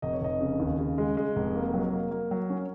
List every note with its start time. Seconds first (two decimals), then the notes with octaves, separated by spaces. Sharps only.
0.02 F1 D#5
0.13 C#5
0.21 F1 D#5
0.41 C#3
0.60 D#2
0.79 C#3
0.98 G#3
1.17 G#3
1.36 F1
1.55 A#3
1.74 F#3
1.93 A#3
2.11 A#3
2.31 F#3
2.50 C#4